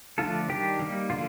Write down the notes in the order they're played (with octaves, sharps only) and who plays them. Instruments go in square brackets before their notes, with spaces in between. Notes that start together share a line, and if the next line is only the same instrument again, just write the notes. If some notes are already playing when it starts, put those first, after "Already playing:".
[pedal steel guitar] D3 F3 A3 D4 F4 A4
D#3 G3 D4 G4
G3 A#3 D#4
D3 F3 A#3 F4